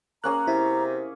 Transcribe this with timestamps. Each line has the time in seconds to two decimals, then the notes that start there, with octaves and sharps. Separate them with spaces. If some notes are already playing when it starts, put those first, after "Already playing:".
0.24 A#3 C#4 G#4 A#5 F#6
0.47 C3 E4